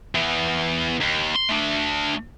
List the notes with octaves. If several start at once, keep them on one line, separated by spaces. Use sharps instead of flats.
E3 B3
D#2
C6
A3 D4